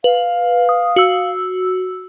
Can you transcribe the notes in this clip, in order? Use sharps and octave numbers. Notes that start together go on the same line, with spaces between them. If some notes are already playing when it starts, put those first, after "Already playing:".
B4 F5
D#6
F#4 E6